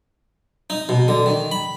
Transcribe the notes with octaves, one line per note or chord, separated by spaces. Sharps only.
D#4
B2
D3
D#3
B5